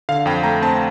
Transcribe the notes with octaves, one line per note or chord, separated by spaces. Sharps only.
D3 F5
F2 G5
A3 A#5
C4 A5